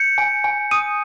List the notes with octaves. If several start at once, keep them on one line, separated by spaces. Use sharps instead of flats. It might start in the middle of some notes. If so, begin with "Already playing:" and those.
Already playing: G6 C#7
G#5
G#5
D#6 D#7